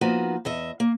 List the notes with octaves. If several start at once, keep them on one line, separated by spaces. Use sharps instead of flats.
F3 A#3 B3 D#4 F#4
E2 D#5 E5
A#3